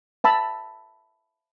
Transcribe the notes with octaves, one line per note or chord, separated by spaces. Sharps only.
E5 A5 B5 E6